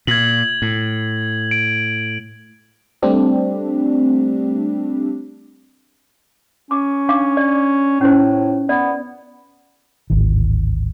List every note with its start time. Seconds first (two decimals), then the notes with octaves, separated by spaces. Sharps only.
0.07 A#2 G#6 F#7
0.62 A2
1.51 D7
3.02 G3 A3 C4 D4 G4
6.71 C#4 D6
7.09 D4 F5 D6
7.37 D5
8.01 A2 C#4 D#4 C5
8.69 B3 D5
10.10 D1 G#1 D#3